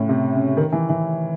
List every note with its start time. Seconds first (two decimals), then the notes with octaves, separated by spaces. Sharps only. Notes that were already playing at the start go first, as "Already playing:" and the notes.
Already playing: A2 C#3
0.09 C3
0.33 C#3
0.57 D#3
0.72 E3
0.89 E3